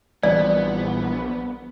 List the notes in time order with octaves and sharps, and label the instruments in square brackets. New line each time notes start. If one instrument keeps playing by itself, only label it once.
[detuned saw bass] A#1 [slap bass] E3 G3 C4 [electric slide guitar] B3 [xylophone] D5